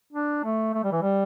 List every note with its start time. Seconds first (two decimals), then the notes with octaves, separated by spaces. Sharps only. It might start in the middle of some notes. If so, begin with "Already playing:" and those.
0.13 D4
0.44 A3
0.74 A3
0.84 G3
0.92 E3
1.02 G3